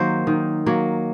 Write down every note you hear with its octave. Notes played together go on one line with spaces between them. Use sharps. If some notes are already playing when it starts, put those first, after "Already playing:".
Already playing: D#3 F#3 A#3 C5
D#3
F#3 A#3